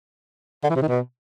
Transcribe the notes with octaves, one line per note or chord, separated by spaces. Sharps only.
D3
E3
C3
D#3
B2